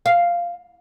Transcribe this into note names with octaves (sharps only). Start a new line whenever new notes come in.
F5